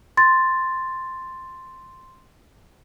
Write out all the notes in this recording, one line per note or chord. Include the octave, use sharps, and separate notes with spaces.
C6 A6